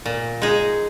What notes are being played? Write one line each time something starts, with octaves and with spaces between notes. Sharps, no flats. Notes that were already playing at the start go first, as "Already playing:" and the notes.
A#2
G#3 D#4 G#4